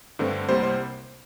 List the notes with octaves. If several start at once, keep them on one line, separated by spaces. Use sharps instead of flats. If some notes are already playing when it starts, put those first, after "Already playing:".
G2 D3 A3 C4
C2 C3 G3 A#3 C5
C5